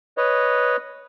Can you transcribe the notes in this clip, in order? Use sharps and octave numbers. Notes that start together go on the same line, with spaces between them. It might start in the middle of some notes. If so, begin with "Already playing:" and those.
B4 C#5 D#5